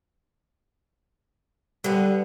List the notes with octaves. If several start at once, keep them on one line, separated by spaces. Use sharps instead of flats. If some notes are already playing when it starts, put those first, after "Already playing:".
D3 G3 B3